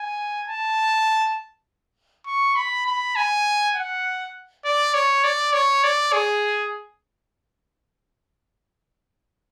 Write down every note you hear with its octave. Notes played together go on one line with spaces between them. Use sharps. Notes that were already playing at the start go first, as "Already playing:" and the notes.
Already playing: G#5
A5
C#6
B5
B5
G#5
F#5
D5
C#5
D5
C#5
D5
G#4